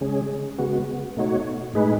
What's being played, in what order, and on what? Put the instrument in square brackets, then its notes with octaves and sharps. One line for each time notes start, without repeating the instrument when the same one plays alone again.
[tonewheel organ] C#3 G#3 C#4 G#4
C#3 G#3 B3 F#4
B2 A3 D#4 F#4 C#5
A2 G#3 D#4 G#4 B4